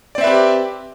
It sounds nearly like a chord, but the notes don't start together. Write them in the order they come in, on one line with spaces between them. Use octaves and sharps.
D5 C4 E5 B4 G4